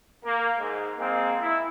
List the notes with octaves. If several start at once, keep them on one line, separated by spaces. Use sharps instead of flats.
A#3
G#2
G#3 A#3 C4
E4